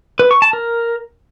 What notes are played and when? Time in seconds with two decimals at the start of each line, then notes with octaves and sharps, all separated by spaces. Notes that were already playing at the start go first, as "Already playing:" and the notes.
0.19 B4
0.31 C#6
0.42 A5
0.53 A#4